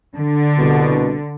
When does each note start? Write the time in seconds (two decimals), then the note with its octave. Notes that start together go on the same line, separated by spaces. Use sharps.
0.15 D3
0.58 C2 B2